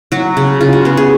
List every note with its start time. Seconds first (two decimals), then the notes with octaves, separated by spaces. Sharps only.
0.12 F#3 F#4
0.37 C#3
0.61 C#3 F4
0.73 F#4
0.85 B3 G#4
0.97 G#4